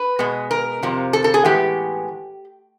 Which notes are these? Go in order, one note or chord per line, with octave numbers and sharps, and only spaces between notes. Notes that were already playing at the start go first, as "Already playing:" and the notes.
Already playing: B4
B2 G#3 B3
A#4
F2 C3 F3
A4
A4
G#4
A2 E3 G#3 B3 G4